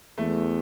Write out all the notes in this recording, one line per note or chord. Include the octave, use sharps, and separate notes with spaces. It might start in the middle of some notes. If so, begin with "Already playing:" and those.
E2 A3